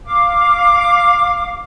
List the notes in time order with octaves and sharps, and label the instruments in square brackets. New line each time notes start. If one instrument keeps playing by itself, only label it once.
[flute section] F5 D6